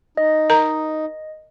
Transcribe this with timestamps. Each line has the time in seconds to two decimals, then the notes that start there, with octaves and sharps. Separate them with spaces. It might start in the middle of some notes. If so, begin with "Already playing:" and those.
0.17 D#4 D#5
0.50 A#4 A#5